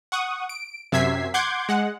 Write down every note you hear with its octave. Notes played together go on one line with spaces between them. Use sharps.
F#5 C#6 D#6
D7
F#2 C3 E5 G#6 B6 C7
F#5 C6 D6 G6 G#6
G#3 F#5